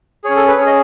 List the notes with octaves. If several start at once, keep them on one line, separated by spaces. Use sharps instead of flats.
C#4 G#4 C#5
A4
B4
C#4 G#4 C#5
D#5